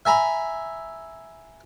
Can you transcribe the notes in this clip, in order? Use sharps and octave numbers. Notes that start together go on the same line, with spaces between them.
E5 G#5 A#5 B5